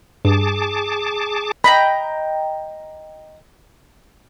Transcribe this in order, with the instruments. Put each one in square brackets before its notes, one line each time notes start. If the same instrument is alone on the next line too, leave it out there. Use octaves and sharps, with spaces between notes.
[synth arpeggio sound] G2 [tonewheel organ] G#4 A5 D6
[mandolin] D#5 G5 A#5 [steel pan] B5